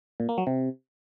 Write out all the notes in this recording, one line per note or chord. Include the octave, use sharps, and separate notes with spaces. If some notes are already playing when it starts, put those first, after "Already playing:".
A#2
A#3
F#3
C3